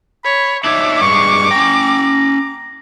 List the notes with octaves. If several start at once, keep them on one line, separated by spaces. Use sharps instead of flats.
C#5 B5
D4 D#4 C#5 E5 D6
G2 G#3 C#6
C#4 G5 A#5